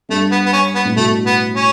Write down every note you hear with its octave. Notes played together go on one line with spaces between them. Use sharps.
G2 A3
B3
B3
C#4
B3
A2
B2 A3
B3
C#4